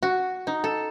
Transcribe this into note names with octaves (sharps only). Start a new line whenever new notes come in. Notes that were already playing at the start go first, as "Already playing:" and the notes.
F#4
D#4
A4